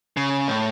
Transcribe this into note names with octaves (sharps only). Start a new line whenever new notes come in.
C#3
A2